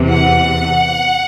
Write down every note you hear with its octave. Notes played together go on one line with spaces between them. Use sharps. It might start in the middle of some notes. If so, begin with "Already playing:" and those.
Already playing: E2 C3 E3
F#5